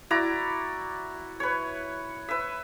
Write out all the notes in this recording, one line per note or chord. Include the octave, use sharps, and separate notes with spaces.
E4 F#4 D5 A#5
B4 C#5
B4 E5